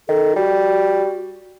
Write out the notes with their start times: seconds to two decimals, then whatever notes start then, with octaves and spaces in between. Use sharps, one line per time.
0.08 D#3 A4
0.36 G3 F#4